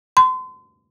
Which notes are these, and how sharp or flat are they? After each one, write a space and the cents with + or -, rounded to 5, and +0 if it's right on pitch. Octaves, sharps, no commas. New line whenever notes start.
C6 -35